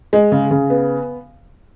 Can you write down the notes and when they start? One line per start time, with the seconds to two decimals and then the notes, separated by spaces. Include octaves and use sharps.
0.13 G#3
0.32 C#3
0.51 C#3
0.70 B3